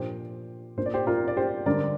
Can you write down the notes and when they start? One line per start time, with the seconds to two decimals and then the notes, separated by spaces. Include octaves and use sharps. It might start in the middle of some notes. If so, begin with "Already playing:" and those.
Already playing: A#2 F3 D4 G4 C5
0.77 A#2 A#3 D4 C5
0.86 D5
0.94 G4 C5
1.07 F4 A#4
1.28 D5
1.37 G4 C5
1.66 D3 G3 D4 A#4 D5